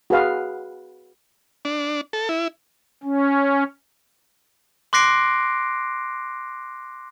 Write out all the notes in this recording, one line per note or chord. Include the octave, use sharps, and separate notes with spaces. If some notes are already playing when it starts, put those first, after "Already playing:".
F#4 G#4 B4 F5
D4
A4
E4
C#4
C6 D6 F#6 A#6 C7 D7